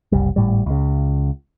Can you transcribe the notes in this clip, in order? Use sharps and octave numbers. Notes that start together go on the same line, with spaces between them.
F#1 C2 G3
G#1 A2 G3
C#2 C#3